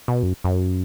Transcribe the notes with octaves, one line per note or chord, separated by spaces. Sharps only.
B2
F#2
F#2